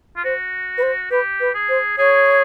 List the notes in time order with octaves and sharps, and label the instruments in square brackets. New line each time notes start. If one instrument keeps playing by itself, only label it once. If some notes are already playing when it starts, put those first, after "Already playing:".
[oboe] F4
[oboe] F#4 [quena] C5
[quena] B4
C5
[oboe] G4 [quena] B4
[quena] B4
[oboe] G#4
[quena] C5
[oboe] G#4 [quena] C#5